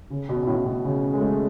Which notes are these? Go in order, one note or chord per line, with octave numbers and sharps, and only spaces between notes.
C#3
B2
B2
A2
A2
B2
C#3
G#3
A3